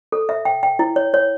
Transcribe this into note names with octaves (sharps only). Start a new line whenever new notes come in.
A4
E5
G5
G5
E4
C#5
C#5